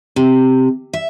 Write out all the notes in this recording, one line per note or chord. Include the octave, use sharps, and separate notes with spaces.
C3
E5